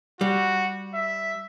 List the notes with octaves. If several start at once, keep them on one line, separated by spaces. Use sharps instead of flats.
G3 F#4
E5